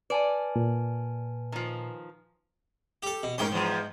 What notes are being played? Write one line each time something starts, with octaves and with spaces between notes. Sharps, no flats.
B4 D5 G#5 A5
A#2
D#3 F3
G4 A4
B2
G#2 C#4 G4 A#4 G5 C6
E2 F3